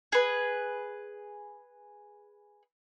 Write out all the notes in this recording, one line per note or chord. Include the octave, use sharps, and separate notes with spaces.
G#4 B4